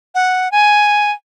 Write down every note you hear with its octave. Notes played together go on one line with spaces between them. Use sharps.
F#5
G#5